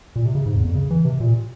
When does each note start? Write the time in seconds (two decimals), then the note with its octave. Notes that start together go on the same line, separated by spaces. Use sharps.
0.16 A#2
0.25 C3
0.35 C#3
0.46 G#2
0.56 E2
0.65 F2
0.75 C#3
0.90 E3
1.05 C3
1.20 A#2